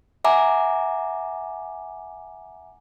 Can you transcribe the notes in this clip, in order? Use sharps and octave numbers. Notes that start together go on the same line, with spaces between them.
E5 F#5 G#5 A#5 D6